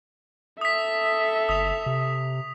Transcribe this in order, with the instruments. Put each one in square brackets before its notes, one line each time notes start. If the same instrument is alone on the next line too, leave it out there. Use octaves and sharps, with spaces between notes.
[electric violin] A4 E5 [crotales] D#6 B6
[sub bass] F#1 [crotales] D#6 F7
[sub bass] C3